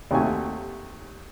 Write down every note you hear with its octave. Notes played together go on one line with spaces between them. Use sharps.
D#2 C3 A3 F#4 G#5